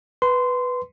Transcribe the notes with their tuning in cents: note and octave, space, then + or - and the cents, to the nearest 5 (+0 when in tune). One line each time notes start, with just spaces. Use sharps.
B4 +0 C6 -15